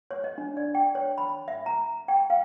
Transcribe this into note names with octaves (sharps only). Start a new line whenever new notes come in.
C#5
D#5
D4
D5
G5
C#5
B5
E5
A#5
G5
F5